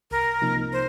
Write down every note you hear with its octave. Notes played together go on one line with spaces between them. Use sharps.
C2 A#4
C3 F3 A#3 D#4
C5